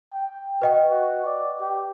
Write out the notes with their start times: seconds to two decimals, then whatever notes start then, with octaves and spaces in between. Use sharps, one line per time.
0.13 G5
0.62 F#4 B4 D#5 G5
0.91 F#4
1.26 D5
1.61 G4